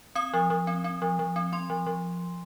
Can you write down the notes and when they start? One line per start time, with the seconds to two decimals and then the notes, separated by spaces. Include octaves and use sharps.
0.15 C4 D#6
0.33 F3
0.50 F3
0.67 C4
0.84 C4
1.02 F3
1.19 F3
1.36 C4
1.53 C4 C6
1.70 F3
1.86 F3